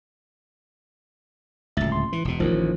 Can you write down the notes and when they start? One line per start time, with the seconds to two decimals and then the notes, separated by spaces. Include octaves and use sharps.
1.77 D1 C#2 E5 A6
1.92 C6
2.13 E3
2.25 E1 B2
2.40 A1 D#2 D#3 F3